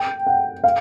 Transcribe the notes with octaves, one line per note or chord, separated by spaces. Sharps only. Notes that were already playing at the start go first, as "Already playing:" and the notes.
Already playing: G5
F#5
F5